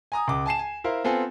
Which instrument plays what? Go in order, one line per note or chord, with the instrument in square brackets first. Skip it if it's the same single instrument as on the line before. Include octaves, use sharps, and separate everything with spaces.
[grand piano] G#5 A#5 D#6
C#2 D6
G#5 A5 C7 E7
G#5
E4 A#4 C5 F5
B3 C4 F4 A4 G#5